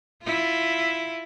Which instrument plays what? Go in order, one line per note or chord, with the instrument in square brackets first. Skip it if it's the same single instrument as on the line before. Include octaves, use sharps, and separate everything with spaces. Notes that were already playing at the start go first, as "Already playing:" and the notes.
[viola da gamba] E4 F4